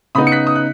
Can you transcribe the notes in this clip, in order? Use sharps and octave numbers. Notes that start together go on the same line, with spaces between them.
C#3 B3 D#4 B5 D#6
C#7
F#6 B6
D#6
F#6